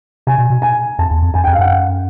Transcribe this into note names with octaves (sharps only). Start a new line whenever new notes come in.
C3 G#5
B2
B2
G#5
F2 A5
E2
F2
F2 G#5
G5
F2
F5
F#2 F#5